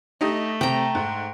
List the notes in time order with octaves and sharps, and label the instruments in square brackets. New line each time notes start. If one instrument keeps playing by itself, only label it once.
[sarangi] A3 [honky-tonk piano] D#4 G4 D#5
[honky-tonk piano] C3 [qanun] G5 A#5
[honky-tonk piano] G#2